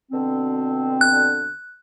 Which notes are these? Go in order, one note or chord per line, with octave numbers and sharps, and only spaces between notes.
B2 D3 C4
F#6